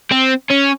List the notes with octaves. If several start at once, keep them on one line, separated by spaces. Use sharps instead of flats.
C4
C#4